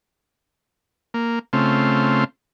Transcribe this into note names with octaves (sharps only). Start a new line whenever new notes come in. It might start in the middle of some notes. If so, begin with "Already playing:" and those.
A#3
C#3 A3 C4 F4